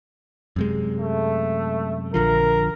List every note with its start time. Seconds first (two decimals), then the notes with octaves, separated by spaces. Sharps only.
0.56 F#2 C3 G#3
1.00 A3
2.14 A#1 D3 F3 A#4